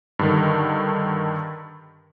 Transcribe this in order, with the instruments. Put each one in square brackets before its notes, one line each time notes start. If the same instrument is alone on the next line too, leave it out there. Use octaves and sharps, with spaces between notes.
[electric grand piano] G2 D3 D#3